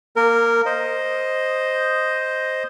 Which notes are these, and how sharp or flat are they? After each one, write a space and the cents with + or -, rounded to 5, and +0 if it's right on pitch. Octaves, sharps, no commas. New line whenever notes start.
A#3 +5 A#4 -15
C5 +0 D#5 +0